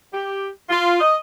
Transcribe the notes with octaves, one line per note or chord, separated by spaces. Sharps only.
G4
F4
D#5